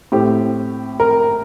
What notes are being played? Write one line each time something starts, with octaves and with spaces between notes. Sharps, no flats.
A2 A3 C4 G4
A#4